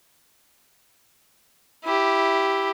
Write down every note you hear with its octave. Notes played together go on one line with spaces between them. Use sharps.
E4 G4